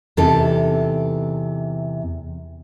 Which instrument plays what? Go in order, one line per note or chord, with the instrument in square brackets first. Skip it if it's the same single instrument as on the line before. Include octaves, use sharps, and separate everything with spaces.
[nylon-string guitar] E2 C3 D#4 A4